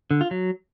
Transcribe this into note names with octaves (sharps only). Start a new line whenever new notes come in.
D3
F4
F#3